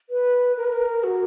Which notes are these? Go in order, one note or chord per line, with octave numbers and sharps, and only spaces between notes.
B4
A#4
B4
A#4
F#4